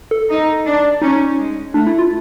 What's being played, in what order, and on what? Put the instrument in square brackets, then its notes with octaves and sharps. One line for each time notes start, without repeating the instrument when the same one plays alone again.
[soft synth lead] A4
[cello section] D#4
D4
[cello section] C#4 [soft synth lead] D#4
[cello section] G#3
[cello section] A3 [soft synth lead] D4
[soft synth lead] E4
F4